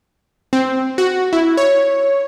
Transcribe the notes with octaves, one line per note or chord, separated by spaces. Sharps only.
C4
F#4
E4
C#5